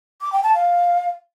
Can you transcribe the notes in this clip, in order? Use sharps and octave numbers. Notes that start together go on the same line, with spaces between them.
D6
G5
A5
F5